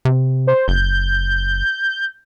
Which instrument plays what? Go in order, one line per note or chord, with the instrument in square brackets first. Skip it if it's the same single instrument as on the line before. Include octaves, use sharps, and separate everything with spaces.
[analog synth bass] C3
[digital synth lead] C5
[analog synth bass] F#1 [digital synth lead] G6